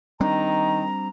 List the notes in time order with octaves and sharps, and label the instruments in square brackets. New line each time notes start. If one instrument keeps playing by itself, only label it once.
[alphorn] D#3 [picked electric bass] G3 C4 D4 [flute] A#5